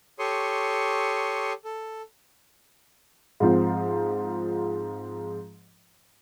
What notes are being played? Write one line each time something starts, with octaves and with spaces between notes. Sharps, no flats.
G4 A4 C#5 C6 C#6 D#6
A4
G#2 F3 C4